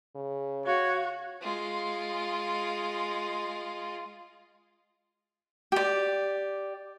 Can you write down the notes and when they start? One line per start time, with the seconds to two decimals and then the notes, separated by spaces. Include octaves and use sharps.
0.15 C#3
0.66 F#4 C#5 F5
1.41 G#3 F4
5.72 G4 D5